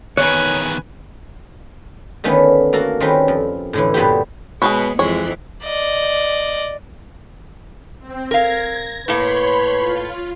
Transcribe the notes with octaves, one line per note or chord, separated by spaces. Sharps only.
E2 D#3 B4 C#5 G#5 F#6
D3 D#3 A3 B3 C#4
A#3 F#4 A4 A#4
D#3 G3 C4 C#4 A#4 B4
F2
A2 D3 E3
G2 A#2 B3 D4 F#4 G4
B2 G#3 B3 G#4 B4 C#5
F2 E3 G#3 C#5
D5 D#5
C4
A#4 F5 G#6 A#6
A2 A#3 B4 C#5 B5 C6
F4